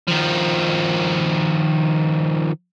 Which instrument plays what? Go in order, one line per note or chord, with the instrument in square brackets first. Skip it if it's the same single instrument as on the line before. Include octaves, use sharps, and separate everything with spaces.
[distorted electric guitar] D#3 F3